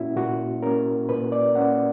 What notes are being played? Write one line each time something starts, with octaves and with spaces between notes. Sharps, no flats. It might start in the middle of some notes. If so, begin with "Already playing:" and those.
Already playing: A#2 A#3 C#4 E4 F#4
A#2 F#4
A#3 C#4 A#4
A#2 B4
D5
A#3 C#4 F#5